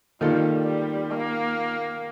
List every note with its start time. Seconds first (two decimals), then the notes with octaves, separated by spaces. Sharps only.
0.21 D#3 G3 A#3 F4 A4
0.66 G3
1.12 A#3